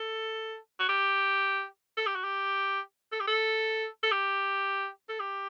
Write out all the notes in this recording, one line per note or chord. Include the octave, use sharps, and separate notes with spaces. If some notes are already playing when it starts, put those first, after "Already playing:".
Already playing: A4
F#4
G4
A4
G4
F#4
G4
A4
G4
A4
A4
G4
A4
G4